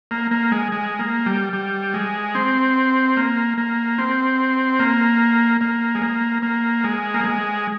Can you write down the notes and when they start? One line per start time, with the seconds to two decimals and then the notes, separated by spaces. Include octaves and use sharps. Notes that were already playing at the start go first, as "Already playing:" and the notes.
0.11 A#3
0.31 A#3
0.52 G#3
0.72 G#3
0.99 A#3
1.26 G3
1.53 G3
1.94 G#3
2.35 C4
3.17 A#3
3.58 A#3
3.98 C4
4.79 A#3
5.61 A#3
5.95 G#3
6.02 A#3
6.42 A#3
6.84 G#3
7.14 A#3
7.24 G#3